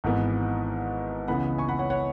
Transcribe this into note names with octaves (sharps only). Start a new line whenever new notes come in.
G#1 G#2 E3 B3
C#2 C#3 E3 B3 F#5 B5
G#5 C#6
F#5 B5
C#5 F#5
C#5 F#5